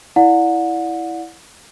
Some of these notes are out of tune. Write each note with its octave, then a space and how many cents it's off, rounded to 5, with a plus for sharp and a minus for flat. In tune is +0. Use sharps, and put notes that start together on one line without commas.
E4 +0 D5 -10 F#5 -35